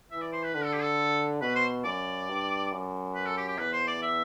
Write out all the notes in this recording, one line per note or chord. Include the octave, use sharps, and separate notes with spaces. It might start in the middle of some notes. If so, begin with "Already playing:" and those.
E3 E5
D5
C5
B4
D3 B4
A4
G4
A4
B2 B4
C5
F#2 D5
G2
F#2
B4
A4
G4
G4
E2 B4
C5
D5
E5